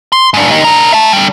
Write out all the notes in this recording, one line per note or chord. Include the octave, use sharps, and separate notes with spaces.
C6
G#2 D4
D#4 G4
D4 A#4
E5 A5
D3 G3